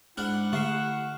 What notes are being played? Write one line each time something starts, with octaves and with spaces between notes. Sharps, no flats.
G#2 D4 E4 F#5 F6 F#6 F#7
D3 A3 C#6 F6 C7 E7